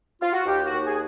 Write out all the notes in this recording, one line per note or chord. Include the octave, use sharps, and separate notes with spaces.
F4
F#4
D#2 G4
F#4
D#2
G#4